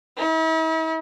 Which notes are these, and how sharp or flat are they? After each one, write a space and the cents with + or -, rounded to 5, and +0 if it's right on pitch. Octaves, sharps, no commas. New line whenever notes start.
E4 -45